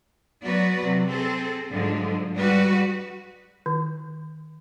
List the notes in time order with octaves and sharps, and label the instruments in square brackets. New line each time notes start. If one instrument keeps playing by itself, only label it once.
[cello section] F#3 B3 F#4 B4 D5
C3 F#3
C4 G#4 A4
G#2 D3 F3 F#3 G#3
G3 G#3 F#4 B4
[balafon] D#3